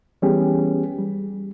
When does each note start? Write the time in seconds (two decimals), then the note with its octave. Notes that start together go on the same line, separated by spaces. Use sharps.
0.22 E3 G3 B3 C#4 G4 G#4
0.98 G3